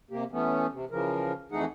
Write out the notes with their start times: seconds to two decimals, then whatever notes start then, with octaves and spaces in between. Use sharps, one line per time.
0.11 C3 A#3 G4
0.32 E3 A3 B3 C#4
0.72 C3
0.91 C#3 E3 F3 A#4
1.52 F2 E3 A3 D#4 G#4 F#5